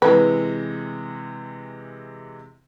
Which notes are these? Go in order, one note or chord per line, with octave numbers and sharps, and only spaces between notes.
C3 E3 G#3 B4